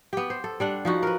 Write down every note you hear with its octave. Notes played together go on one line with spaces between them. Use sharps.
B3 G4
C5
A4
G3 D4 F#5
F3 D#4 F#4
A#4 B4